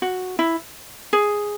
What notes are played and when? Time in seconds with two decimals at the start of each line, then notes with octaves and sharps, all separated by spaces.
0.02 F#4
0.39 E4
1.13 G#4